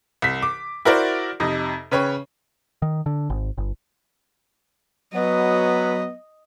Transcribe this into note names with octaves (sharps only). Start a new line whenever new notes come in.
C2 B6
D6
E4 F#4 A#4 C5 D5
F2 C3 D#4
C#3 B4 C#5 G5 C#6
D#3
D3
G#1
G1
F#3 B3 D#5